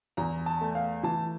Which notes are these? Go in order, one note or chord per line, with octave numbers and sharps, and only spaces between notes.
E2 A#5
A5
A3
F5
E3 A5